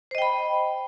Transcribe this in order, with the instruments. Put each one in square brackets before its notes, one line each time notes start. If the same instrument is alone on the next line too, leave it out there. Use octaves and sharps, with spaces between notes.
[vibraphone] C5
D#5
G5
B5